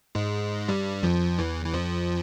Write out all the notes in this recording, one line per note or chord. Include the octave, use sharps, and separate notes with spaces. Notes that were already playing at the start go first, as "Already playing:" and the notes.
G#2 G#3
G2 G3
F2 F3
E2 E3
E3
F2 F3